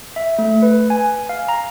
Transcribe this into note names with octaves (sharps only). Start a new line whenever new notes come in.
E5
A3
B4
G#5
F5
A#5